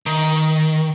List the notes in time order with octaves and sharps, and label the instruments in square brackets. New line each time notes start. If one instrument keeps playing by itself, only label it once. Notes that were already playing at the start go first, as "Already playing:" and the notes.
[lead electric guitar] D#3